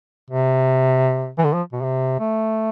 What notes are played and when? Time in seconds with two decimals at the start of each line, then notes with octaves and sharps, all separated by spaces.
0.30 C3
1.38 E3
1.44 D3
1.53 F3
1.72 B2
1.82 C3
2.20 A3